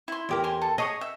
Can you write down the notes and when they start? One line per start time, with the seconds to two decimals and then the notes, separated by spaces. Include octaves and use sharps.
0.08 E4 C6
0.29 E2 G4 A#4
0.44 G#5 C6
0.62 A4
0.78 G#4 C#5 D#5 D#6
1.01 E5